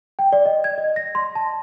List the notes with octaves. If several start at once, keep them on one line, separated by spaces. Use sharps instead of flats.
G5
D5
D#5
G#6
D#5
A#6
C6
A5